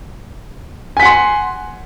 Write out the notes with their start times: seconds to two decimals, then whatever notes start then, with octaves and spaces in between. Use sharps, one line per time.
0.97 G#5
1.00 B6
1.03 F#5
1.06 C6